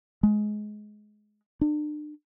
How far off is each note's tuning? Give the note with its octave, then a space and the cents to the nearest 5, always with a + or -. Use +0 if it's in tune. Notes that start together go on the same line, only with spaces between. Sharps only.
G#3 +20
D4 +40